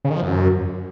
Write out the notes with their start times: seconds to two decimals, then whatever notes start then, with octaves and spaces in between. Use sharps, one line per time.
0.04 C#3
0.10 D#3
0.16 F3
0.22 F#2